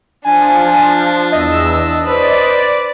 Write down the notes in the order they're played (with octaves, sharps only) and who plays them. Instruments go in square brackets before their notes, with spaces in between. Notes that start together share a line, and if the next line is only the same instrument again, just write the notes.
[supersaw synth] F3 [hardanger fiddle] D4 [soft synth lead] G#5
[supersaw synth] E2 E6 [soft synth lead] D#5
[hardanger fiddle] B4 C5 [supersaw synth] D5